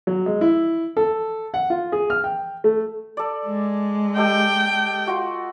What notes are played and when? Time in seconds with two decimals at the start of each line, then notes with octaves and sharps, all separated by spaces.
0.07 F#3
0.26 G#3
0.41 E4
0.97 A4
1.54 F#5
1.70 F4
1.92 G#4
2.10 F6
2.24 G5
2.64 A3
3.17 A4 D5
3.46 G#3
4.17 G4 A4 D#5 G5
5.07 F4 F#4